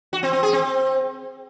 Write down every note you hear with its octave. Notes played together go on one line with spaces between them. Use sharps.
F#4
C4
C4
G#4
C4